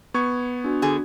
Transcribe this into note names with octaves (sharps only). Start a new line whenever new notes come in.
B3 C#6 G#6
D4 F#4
D3 G#4